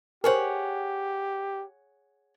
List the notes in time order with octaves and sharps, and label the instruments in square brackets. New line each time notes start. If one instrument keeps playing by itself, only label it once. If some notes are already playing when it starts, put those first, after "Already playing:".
[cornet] G4 [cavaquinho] G#4 C#5 F#5 [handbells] A#4 C5